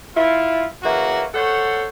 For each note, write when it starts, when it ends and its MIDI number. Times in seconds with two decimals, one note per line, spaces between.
0.16 0.65 64
0.16 0.65 65
0.83 1.23 49
0.83 1.23 52
0.83 1.23 58
0.83 1.23 66
1.33 1.86 69
1.33 1.86 72
1.33 1.86 73
1.33 1.86 78